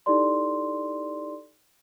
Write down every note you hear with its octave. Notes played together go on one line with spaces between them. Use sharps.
D#4 E4 G4 A4 D5 C6